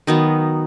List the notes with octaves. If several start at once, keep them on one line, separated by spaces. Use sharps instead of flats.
D#3 F#3 B3 D#4